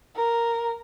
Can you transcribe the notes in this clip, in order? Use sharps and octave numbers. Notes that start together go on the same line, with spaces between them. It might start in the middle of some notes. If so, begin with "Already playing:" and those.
A#4